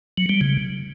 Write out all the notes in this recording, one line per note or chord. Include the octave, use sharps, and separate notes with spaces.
F#3
G3
C#3